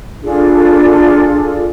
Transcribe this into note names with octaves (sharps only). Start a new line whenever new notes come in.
D4 F4 G#4 A4